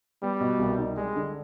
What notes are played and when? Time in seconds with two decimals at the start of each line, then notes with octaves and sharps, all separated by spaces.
0.23 G3 B3
0.41 B2
0.59 C2
0.78 D#4
0.97 G3 G#3
1.16 D3